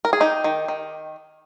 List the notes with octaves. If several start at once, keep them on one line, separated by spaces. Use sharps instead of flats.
A#4
G#4
D#4 G4
D#3
D#3